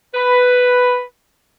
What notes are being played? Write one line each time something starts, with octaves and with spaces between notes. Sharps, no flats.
B4